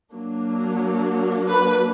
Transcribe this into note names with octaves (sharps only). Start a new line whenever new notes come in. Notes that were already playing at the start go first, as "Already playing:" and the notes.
F#3 A#3 D4
B4